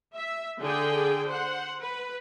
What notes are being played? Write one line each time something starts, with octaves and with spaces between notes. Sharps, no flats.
E5
D3 G#4 G5
C5 F#5
B4